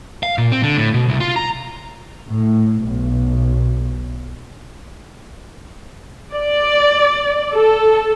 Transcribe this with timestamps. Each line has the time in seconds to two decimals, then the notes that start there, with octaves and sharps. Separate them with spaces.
0.23 F5
0.38 A#2
0.52 C4
0.63 D3
0.77 A2
0.94 B2
1.09 C2
1.20 F4
1.36 A#5
2.28 A2
2.82 B1
6.34 D5
7.55 A4